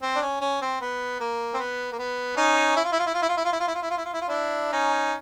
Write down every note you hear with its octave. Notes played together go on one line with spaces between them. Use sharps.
C4
D4
C#4
C#4
C4
B3
A#3
C4
B3
A#3
B3
C#4 D#4
E4
F4
E4
F4
E4
F4
E4
F4
E4
F4
E4
F4
E4
F4
E4
F4
E4
F4
E4
F4
D4 E4
C#4 D#4